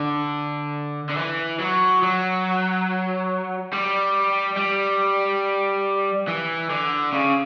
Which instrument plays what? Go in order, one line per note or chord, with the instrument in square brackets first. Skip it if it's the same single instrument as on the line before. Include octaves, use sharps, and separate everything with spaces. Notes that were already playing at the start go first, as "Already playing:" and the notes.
Already playing: [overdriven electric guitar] D3
D3
E3
F#3
F#3
G3
G3
E3
D3
C#3